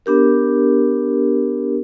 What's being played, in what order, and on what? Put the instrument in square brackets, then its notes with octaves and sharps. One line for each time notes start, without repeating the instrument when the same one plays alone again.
[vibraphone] B3 D4 G4 A#4